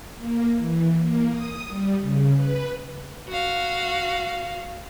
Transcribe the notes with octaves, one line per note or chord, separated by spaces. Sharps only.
A#3
E3
A#3
D#6
G3
C#3
B4
F#4 F5